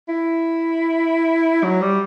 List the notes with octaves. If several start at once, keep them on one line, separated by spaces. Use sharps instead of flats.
E4
F#3
G3